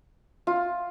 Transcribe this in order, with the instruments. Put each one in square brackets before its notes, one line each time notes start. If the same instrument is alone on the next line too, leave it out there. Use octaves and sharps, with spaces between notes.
[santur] F4